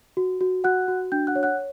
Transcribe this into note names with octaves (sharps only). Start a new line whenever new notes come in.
F#4
F#4
F#4 F#5 F#6
F#4
D4 G5 G6
F#5 F#6
C#5
F#5 F#6